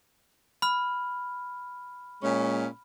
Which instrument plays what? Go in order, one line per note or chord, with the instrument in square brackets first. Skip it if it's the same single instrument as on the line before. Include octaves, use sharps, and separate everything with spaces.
[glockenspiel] B5 F6
[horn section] A#2 G#3 C#4